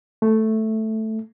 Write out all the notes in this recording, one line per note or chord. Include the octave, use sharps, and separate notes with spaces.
A3